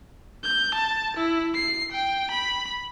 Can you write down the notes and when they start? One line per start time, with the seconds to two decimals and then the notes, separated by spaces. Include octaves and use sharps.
0.44 G6
0.74 A5
1.17 E4
1.55 C7
1.92 G5
2.31 B5